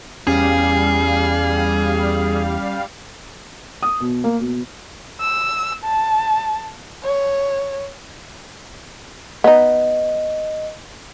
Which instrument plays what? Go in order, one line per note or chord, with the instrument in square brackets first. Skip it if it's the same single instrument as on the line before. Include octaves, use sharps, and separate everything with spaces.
[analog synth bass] E2 [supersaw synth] G3 F5 [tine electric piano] C#4 [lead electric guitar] G#4
[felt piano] D#6
B2
A#3
B2
[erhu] E6
A5
C#5
[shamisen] B3 D#4 [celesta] D#5